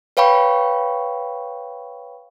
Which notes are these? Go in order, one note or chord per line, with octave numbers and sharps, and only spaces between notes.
B4 C#5 F5 G5 B5 C#6